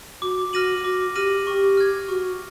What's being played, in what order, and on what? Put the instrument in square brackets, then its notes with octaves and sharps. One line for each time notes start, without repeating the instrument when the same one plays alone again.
[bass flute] F#4 [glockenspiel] D6
[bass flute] F#4 [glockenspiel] F6 A#6 D#7 F#7
[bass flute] F#4 [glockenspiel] D6
[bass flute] G4 [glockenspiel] F6 A#6 D#7 F#7
[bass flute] G4 [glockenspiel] C#6
[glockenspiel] F6 G#6
[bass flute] F#4 [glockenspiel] C#6